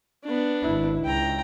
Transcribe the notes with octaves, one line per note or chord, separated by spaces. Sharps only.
B3 D4
G#1 E4
C#2 G5 A#5